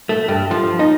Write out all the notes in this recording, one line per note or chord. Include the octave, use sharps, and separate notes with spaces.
A3
G2
F3
D#4